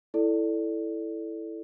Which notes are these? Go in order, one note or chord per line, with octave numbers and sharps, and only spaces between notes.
E4 A4 D5